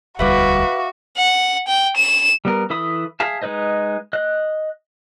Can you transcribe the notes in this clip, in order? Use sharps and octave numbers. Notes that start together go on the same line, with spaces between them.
E1 D2 G3 F#4 B4 E5 F5 D6
F#5
G5
E7
G3 B3 A#4
E3 A4 E5 B5 D#6
G#4 E5 F5 A5
G#3 D#4 B4 C5 D#5
D#5 F#6